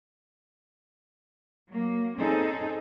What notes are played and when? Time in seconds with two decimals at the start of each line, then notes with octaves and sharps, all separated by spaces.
1.69 F#3 A#3
2.18 C4 C#4 D#4 G#4 A4